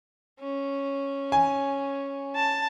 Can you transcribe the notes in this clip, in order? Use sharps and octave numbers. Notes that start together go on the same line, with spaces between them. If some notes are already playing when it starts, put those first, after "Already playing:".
C#4
G#5
A5